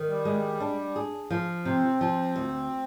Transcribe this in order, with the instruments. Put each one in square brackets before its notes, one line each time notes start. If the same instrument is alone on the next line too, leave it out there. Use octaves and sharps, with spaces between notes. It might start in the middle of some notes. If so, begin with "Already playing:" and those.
Already playing: [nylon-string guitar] D#3
[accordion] G3
[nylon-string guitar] G#3
D4
G#4
F3
[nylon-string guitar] C3 [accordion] C4
[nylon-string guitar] F3
D2